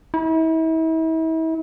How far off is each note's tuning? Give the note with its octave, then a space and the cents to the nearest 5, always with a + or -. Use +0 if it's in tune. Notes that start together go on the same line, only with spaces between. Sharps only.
E4 -40